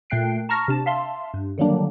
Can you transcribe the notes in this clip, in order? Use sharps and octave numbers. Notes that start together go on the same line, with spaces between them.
A#2 A3 G5 F#6 C7 D7
A5 A#5 C#6 F6 A#6
C3 D4 A5
E5 F5 A5 C6
G2
D3 D#3 F#3 G3 A#3 D4